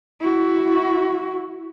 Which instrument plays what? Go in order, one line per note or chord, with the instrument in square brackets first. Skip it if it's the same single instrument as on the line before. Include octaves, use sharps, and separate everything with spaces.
[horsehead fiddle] E4 F#4